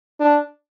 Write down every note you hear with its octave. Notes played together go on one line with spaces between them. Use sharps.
D4